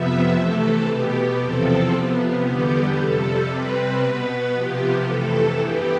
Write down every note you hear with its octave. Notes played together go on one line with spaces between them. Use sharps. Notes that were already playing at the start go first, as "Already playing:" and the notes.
Already playing: F2 C3 F3 B3 E5
C3 E3 A3 A4
B2 B3 G4
E2 C3 F3 C4 A4
C3 F3 B3
E2 D3 G3 B3 G4
F2 C3 G3 A4
C3 G3 C4 B4
B2 B3 B4
C3 F3 B3 G4
F2 C3 E3 A3 A4
G2 E3 B3 G4